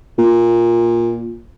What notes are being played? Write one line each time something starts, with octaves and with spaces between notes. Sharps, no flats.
A#2